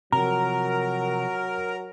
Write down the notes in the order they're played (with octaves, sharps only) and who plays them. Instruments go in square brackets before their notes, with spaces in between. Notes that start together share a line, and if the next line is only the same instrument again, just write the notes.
[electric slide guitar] C3 F3 [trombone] F#3 [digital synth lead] A#4 [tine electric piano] A#5